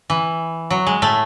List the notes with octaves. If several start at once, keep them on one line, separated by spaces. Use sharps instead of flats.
E3
F#3
G#3
A2 A3